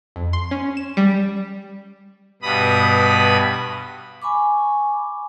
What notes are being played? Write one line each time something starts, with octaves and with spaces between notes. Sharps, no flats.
F2
C6
C#4
E7
G3
G2 B2 B5 D#6
G#5 B5 C#6 D6